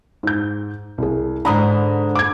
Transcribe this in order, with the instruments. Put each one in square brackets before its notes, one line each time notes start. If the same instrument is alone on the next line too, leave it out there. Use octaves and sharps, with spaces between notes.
[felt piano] G#2 G6
C2 G#4
[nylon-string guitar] G#2 D3 D4 [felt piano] A#5 B5 D#6
[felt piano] D6 G#6